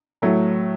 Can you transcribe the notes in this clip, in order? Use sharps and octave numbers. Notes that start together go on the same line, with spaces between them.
A2 F#3 A3